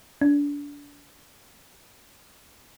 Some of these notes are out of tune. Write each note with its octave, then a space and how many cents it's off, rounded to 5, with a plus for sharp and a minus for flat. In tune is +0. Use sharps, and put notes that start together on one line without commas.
D4 -30